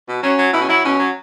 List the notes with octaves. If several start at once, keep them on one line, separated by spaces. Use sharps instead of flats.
B2
F#3 C#4
F#3
B2 E4
C#4
F#3 E4
B2 C#4
F#3